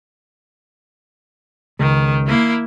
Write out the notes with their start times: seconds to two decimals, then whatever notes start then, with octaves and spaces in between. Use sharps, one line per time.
1.80 C#2 D#3
2.27 A#3 E4